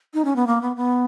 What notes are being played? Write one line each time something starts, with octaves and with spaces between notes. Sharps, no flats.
D#4
C#4
B3
A#3
B3
B3